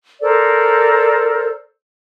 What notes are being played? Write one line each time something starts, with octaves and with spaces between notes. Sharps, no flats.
A4 A#4 C5 D5